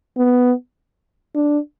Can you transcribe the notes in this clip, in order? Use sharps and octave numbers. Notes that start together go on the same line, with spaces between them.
B3
D4